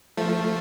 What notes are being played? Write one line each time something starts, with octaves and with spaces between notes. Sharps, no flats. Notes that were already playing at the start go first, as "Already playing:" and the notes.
F3 A3